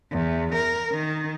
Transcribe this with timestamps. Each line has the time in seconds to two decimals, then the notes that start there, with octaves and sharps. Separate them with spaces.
0.12 E2
0.55 A#4
0.93 D#3